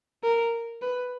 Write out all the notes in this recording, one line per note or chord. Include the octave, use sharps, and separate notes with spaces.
A#4
B4